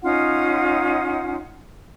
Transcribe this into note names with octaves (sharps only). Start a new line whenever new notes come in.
C#4 D#4 F4 F#5